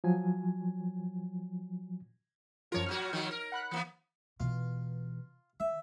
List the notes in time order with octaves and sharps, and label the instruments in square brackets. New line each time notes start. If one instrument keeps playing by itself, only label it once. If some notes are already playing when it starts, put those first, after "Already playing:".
[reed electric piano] F3 F#3 G#5
[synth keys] F#2 F3 F4 [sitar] A#4 C#5
[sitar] A#2 F#3 F#4 [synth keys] F6
[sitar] D#3 F3 F#3
A#4
[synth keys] F#5 B5 F#6
[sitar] E3 A#3 B3
[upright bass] B2 E3 [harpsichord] F4
[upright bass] D#3 [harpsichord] E5